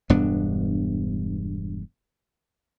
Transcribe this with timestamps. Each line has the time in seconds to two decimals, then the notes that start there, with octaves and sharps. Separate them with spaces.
0.10 E1 G2 B3 D4